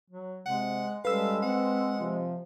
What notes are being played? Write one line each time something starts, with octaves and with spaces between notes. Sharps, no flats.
F#3
C3 G#3 F#5
G3 G#3 C#4 A4 B4 F5 E6
C4 F#5
C3 F3